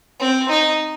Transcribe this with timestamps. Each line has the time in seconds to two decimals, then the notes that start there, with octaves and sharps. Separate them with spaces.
0.20 C4
0.49 D#4